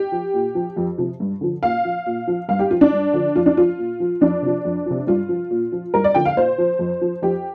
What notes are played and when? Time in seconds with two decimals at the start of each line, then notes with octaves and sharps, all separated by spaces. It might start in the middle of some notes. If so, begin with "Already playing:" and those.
Already playing: G4
0.12 F3
0.34 A#2
0.55 F3
0.77 F2
0.98 C3 F3
1.20 G2
1.41 D3 F3
1.63 A#2 F5
1.85 F3
2.06 A#2
2.27 F3
2.49 G2 F5
2.59 G4
2.71 F3 F4
2.81 D4
2.93 G2
3.13 D3 F3
3.35 F2 F4
3.46 D4
3.57 F3 F4
3.78 A#2
4.00 F3
4.21 F2 D4
4.42 C3 F3
4.65 F2
4.86 C3 F3
5.07 G2 F4
5.29 F3
5.50 A#2
5.72 F3
5.94 G2 A#4
6.04 D5
6.15 D3 F3 G5
6.25 F5
6.36 A#2 C5
6.58 F3
6.79 F2
7.01 F3
7.22 F2 G4